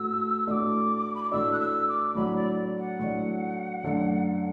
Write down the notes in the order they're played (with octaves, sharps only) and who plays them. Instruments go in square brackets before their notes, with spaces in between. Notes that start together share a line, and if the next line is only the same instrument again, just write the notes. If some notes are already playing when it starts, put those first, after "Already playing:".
Already playing: [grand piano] A2 A3 F#4 [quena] E6
[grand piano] A2 A3 D4 F#4 [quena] D6 E6
[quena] B5
D6
[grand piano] A2 A3 D4 F#4 [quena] E6
[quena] F#6
E6
D6
[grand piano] A2 F#3 D4 [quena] B5
[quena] D5
F#5
[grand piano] A2 F#3 D4
F#2 D3 A3 D4